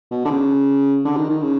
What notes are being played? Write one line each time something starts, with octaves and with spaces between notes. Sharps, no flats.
B2
D3
C#3
D3
D#3
D#3
C#3